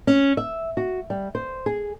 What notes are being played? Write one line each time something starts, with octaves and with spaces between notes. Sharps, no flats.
C#4
E5
F#4
G3
C5
G#4